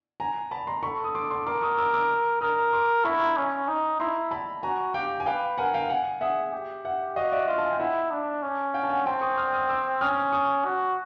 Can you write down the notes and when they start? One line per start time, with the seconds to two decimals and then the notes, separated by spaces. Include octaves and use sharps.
0.20 G#5 A#5
0.51 A5 B5
0.67 A#5 C6
0.83 A4 B5 C#6
1.04 D#6
1.15 C6 D6
1.30 C6 D6
1.47 A#4 C6 D6
1.62 C#6 D#6
1.78 D6 E6
1.94 D6 E6
2.41 A#4 D#6 F6
2.73 C6 D6
3.04 E4 B5 C#6
3.20 A#5 C6
3.37 C#4
3.68 D#4
4.00 E4 A#5 C6
4.31 A5 B5
4.63 F#4 G#5 A#5
4.94 G4 F5 G5
5.20 G#5
5.26 B4 F5 G5
5.58 A#4 F#5 G#5
5.74 F5 G5
5.89 F#5 G#5
6.21 G#4 E5 F#5
6.52 G4
6.85 E5 F#5
7.16 F#4 D#5 F5
7.32 D5 E5
7.48 F4 D#5 F5
7.58 A5
7.65 G#5
7.72 G5
7.79 E4 E5 F#5
8.11 D4
8.42 C#4
8.74 F5 G5
8.83 A5
8.90 F#5 G#5
9.06 C4 G5 A5
9.21 C#6 D#6
9.37 D#6 F6
9.53 D#6 F6
9.69 D6 E6
10.01 C#4 D#6 F6
10.32 C#6 D#6
10.64 F#4